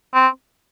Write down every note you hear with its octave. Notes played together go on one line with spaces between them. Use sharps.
C4